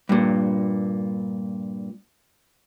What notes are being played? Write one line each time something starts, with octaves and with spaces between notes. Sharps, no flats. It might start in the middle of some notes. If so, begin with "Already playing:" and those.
G2 A#2